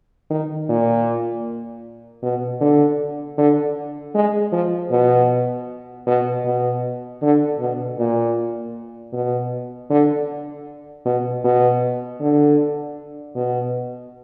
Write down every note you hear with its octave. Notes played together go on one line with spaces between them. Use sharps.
D#3
A#2
B2
D3
D3
G#3
F3
B2
B2
B2
D3
B2
A#2
B2
D3
B2
B2
D3
B2